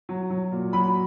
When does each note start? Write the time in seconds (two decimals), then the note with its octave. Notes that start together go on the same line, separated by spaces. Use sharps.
0.09 F#3
0.30 F#3
0.52 A#2
0.73 F#3 B5